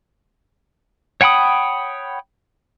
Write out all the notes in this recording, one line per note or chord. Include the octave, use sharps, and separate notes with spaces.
C#5 F#5 G5 B5 D#6